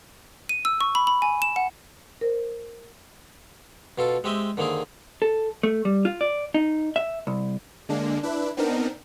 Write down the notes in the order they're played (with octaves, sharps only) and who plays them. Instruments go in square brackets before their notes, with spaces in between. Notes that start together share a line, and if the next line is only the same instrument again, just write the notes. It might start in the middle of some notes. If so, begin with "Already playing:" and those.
[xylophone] D#7
E6
C#6
B5
B5
G#5
E7
F#5
[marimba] A#4 C5
[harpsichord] B2 F4 A4
G#3 C4 G4 D#5 E5
D3 D#3 A#3 C4 G#4
[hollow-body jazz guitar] A4
A3
G3
F4
D5
D#4
E5
C2
[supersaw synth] D3 G#3 A#3 D4
D4 E4 B4
B3 C4 D4 D#4 A#4